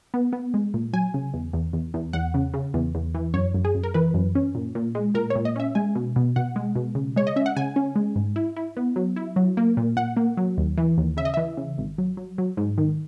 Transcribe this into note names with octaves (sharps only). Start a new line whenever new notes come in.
B3
B3
G#3
A#2
F#3 G#5
C#3
E2
E2
E2
E2
E2 F#5
C#3
C#3
E2
E2
E3
F#2 C#5
F#2
G#4
F#2
A#4
E3 B4
F#2
C#4
A#2
A#2
G#3
A#2 A#4
C#5
A#2
D#5
C#4 E5
G#3 G#5
B2
B2
B2 F#5
G#3
B2
C#3
G#3 C#5
D#5
C#4 E5
F#5
C#3 G#5
C#4
G#3
G#2
E4
E4
B3
F#3
E4
F#3
A#3
A#2
A#2 F#5
A#3
F#3
D#2
E3
D#2
C#3 E5
D#5
E3 E5
C#3
G#1
F#3
F#3
F#3
G#2
D#3